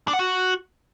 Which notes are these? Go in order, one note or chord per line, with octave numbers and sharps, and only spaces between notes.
D4
F#5
F#4